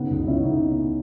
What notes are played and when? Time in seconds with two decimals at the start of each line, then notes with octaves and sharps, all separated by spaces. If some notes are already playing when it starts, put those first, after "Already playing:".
Already playing: C#3 B3 D#4
0.10 C#2
0.27 C#2 C#4 E4
0.44 C#3 B3 D#4